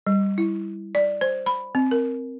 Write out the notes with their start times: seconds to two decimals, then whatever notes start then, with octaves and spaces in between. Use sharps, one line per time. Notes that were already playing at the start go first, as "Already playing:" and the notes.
0.07 G3
0.38 E4
0.95 D5
1.21 C5
1.46 B5
1.75 C4
1.91 A#4